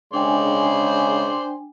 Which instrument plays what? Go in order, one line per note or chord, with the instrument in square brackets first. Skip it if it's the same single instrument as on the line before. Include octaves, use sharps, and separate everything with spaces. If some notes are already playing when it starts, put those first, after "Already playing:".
[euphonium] C#3 [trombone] G#3 [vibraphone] D4 G5 G#5 [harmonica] C5 D5 C6